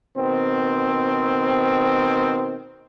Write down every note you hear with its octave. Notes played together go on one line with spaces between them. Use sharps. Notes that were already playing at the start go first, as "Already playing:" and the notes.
B2 D#3 C4